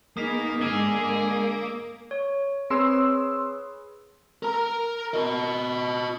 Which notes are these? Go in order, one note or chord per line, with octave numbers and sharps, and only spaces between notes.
A#3 B3 D#4 G#4 D#6 B6
G#2 D3 G#3 A#3 G#4 D6 E6 G7
C#5
C4 G#4 B4 C#5 C6 E6
A#4 A#5
F#4 D#5